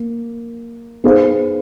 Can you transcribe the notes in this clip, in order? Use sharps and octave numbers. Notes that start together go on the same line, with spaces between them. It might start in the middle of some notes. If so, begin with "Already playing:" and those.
Already playing: A#3
B3 D#4 G#4 C5 F5